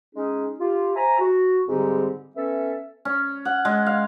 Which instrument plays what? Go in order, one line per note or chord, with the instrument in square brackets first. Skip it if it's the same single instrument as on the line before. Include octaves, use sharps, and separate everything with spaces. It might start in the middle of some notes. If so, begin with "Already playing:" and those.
[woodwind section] G#3 C#4 D#4 G#4
F4 G4
C5 E5 G#5 A#5
F#4
G#2 D3 G3 C4 D#4 G4
B3 C#4 A4 E5
[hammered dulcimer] C#4
F#5
G#3
F5